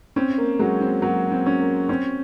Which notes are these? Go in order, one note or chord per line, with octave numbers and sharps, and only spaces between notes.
C4 C#4
A#3
F#3 G#3
C4
F#3 A#3
C4
C#4
A#3
C4 C#4